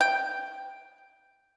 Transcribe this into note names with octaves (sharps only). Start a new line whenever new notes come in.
G5